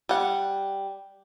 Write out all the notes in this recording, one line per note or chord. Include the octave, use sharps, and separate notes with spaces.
G3 F#5